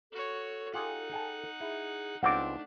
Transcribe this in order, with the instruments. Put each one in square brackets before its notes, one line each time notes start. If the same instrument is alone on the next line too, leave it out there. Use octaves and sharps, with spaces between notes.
[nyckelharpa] F#4 C#5 [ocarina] A4
[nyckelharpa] D#4 F#5 [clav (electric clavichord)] F4 G4 G#4
[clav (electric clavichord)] G#4 G5 A5
[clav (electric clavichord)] E4 [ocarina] G#4
[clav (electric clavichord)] C#2 C4 F4 [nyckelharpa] A3 D4 [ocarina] D#4 [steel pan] F#5 D6